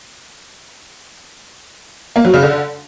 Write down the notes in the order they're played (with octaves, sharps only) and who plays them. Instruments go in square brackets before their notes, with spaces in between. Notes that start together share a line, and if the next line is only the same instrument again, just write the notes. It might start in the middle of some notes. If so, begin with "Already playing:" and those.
[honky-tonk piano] A#3
F#3
C#3
D3